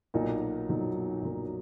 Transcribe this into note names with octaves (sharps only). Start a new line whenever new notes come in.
B1 A#2 F#3 A#3 D#4
B1 A#2 F#3 A#3 D#4
B1 A#2 F#3 A#3 D#4